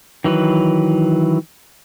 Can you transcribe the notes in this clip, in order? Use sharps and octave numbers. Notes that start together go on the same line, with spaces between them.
D#3 E3 F#3 B4